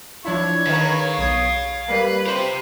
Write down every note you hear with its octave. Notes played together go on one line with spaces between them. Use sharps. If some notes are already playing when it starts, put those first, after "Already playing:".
F3 D4 E4 C#5
D#3 B4 F5 A#5 B5
B1 D#6
G3 A#3 B4
C4 G4 C5